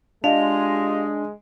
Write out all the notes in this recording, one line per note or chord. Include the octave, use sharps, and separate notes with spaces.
G#3 D4 F4 G4 D#5 F5 F7